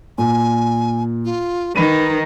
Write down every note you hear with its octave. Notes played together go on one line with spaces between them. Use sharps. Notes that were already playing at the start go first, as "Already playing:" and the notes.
A#2 G#5
F4
D#3 D#4 B4 B5 D#7